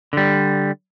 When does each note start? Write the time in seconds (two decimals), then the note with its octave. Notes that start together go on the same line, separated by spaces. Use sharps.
0.13 D3 G3